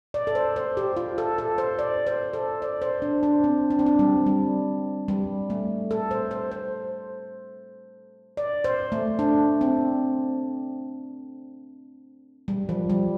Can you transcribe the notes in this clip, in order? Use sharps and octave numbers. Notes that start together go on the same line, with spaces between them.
D5
A4
C5
C5
G4
F4
A4
A4
C5
D5
C5
A4
D5
C5
D4
D4
C4
D4
C4
D4
G3
G3
G3
A3
A4
C5
C5
C5
D5
C5
A3
D4
C4
G3
F3
G3